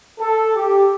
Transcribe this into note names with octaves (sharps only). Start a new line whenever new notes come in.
A4
G4